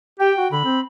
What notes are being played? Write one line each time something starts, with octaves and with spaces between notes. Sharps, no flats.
G4 G5
F#4
D3 B5
C4